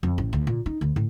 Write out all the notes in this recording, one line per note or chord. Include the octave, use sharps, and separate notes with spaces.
F2
A1
D2
A#2
D#4
D2
A2